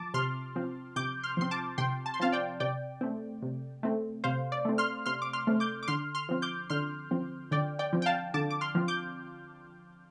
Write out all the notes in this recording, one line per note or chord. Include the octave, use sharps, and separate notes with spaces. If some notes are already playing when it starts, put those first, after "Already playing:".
Already playing: F3 A5 D6
C3 C6 F6
F3 C4
C3 D6 G6
C6 F6
F3 C4 C6
A5 D6
C3 G5 C6
A5
C6
F3 C4 F5 A5
D5 G5
C3 D5 G5
A3 C4
C3
A3 C4
C3 C5 F5
D5
A3 C4
C6 F6
C3 C6 F6
D6
C6 F6
A3 C4
D6 G6
D6
D3 C6 F6
C6 F6
F3 C4
D6 G6
D3 C6 F6
F3 C4
D3 D5 G5
D5 G5
F3 C4
G5
F5 A5
D3 A5 D6
D6
C6 F6
F3 C4
D6 G6